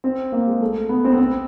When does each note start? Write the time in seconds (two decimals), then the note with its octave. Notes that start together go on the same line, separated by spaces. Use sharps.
0.04 C4
0.32 A#3
0.47 G#3
0.61 A3
0.89 B3
1.04 C4
1.13 B3
1.18 C4